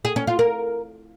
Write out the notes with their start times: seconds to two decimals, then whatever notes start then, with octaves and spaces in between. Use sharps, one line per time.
0.05 G#4
0.16 C#4
0.27 F4
0.39 A#4